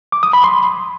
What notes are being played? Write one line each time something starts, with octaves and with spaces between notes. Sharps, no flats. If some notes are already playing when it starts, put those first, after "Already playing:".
D6
D#6
B5
C6